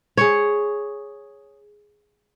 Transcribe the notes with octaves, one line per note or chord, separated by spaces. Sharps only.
G#4 C#5